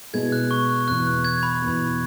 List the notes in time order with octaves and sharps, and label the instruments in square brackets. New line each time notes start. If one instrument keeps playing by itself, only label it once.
[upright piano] B2 G#3 E4 G#4 [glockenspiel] G#6
[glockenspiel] F#6
C#6
F#6
[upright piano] E2 B2 B3 [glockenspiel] F#6
[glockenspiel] F#6
G#6
B5
[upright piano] E2 B2 B3